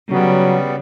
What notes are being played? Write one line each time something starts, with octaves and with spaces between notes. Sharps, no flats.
C#3 F#3 G3 B3